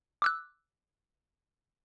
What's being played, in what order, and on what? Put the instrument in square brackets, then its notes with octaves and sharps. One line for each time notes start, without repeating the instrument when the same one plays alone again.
[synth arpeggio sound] D6 E6 F#6